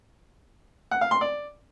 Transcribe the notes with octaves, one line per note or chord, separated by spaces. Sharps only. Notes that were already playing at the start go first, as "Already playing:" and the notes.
F#5
F5
C6
D5